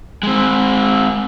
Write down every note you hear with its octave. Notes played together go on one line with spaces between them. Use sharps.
G#3 C4